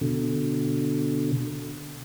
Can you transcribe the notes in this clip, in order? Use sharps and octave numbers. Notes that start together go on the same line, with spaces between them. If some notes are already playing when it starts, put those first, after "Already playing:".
B2 D3